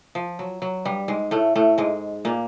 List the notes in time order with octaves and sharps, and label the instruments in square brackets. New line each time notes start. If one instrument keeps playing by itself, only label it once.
[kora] F3
F#3
F#3
G2 G3
G#2 G#3
A2 A3
A2 A3
G#2 G#3
A#2 A#3